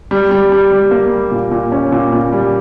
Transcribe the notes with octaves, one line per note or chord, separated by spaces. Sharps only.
G3
G3
G3
G3
A#3
G3
A#2
A#2
C#4
A#2
A#2
G3